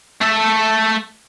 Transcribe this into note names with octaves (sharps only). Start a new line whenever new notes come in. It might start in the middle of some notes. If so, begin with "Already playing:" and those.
A3 A4